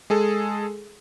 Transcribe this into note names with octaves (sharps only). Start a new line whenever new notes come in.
G#3 G#4 A4